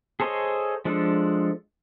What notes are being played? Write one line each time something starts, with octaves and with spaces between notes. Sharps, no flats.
G#4 A4 C5 C#5 D#5
F3 G#3 D4 A4